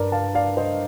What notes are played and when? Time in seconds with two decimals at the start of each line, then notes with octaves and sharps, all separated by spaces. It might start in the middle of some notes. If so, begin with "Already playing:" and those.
Already playing: G2 A#4 D5
0.12 F5 A5
0.35 D5 F5
0.57 C5 D#5